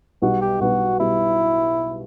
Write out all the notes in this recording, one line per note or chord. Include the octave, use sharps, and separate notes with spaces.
B1 B2 G3 B3 F#4
G4
B1 B2 G3 B3 F#4
B2 G3 B3 E4